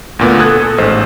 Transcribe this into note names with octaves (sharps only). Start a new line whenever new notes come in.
D2 A#2 B3
A4 D#6 F#6 G#6
A1 G#2 C5 E6